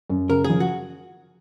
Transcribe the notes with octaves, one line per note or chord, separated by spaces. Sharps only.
F#2
C#3 A#4
G#4
F3
F#4